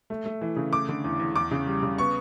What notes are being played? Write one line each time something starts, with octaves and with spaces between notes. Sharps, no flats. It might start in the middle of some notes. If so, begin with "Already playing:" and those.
A3
A3
E3
C#3
A3 D6
D3
E2
E2
E2 D6
C#3
G3
C#3
B3 C#6